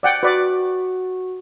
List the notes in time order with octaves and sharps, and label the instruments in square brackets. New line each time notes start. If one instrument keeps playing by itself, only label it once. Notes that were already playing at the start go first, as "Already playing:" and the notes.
[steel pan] D5 F#5 G5
[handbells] F#4 [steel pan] B4 D5